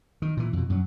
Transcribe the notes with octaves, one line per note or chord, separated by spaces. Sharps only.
D#3
A#2 E3
F2 B2
F#2 F#3